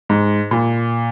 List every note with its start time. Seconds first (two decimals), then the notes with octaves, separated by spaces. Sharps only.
0.09 G#2
0.51 A#2